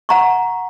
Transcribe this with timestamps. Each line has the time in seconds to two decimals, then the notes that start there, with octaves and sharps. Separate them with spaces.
0.09 F#5 A#5 C#6